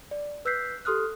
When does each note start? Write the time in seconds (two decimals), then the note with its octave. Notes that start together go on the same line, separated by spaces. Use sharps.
0.11 D5
0.45 B4 E6 F#6 G6 B6 C7
0.85 G4 A4 C6 D#6 F6 F#6